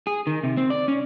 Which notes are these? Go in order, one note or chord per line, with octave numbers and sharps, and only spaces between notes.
G#4
D#3
C3
C4
D5
C#4